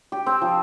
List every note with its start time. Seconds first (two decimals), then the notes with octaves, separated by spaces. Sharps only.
0.12 G4
0.26 C4
0.42 F3